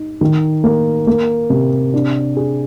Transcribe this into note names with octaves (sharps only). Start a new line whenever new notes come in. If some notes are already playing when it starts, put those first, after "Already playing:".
Already playing: D#4
D#3
A#3
A#3
C3
D4
G#4